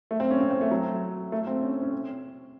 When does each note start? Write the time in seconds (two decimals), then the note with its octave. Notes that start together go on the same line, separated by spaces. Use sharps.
0.11 A3
0.20 C4
0.31 C#4
0.40 C4
0.51 C4
0.61 A3
0.71 F#3
1.32 A3
1.47 C4
1.62 C#4
1.73 C4
1.82 C#4
1.92 C4